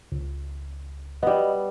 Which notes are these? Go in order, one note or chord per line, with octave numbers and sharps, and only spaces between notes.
C#2
G3 B3 D#5